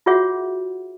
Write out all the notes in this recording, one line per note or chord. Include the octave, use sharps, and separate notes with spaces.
F4 F#4 G#4 C#5 E5 F#5